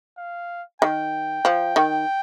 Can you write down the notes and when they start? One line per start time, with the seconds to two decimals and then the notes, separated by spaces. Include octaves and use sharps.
0.18 F5
0.82 D#3 G5
1.45 F3
1.76 D#3